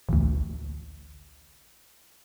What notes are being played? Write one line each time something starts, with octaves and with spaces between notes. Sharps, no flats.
A1 D2